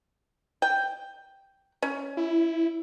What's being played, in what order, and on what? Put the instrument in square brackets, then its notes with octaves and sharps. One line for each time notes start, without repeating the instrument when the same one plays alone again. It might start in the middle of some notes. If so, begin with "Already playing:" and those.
[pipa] G5
C#4
[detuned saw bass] E4